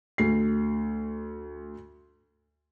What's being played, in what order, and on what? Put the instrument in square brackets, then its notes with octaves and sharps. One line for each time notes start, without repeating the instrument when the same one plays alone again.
[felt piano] D2 C7